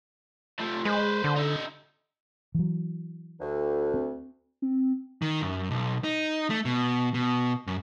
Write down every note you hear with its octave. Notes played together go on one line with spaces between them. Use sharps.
F3 A3
G#3 B4 C5
D3
D#4 E5
E3 F#3
D2
C4
C4
D#3
F#2
B1
D#4
A3
B2
B2
F#2